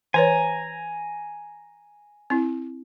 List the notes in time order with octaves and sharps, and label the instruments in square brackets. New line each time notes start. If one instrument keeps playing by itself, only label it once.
[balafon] E3 B4 C#5 [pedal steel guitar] G#5 A#5
[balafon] C4 E4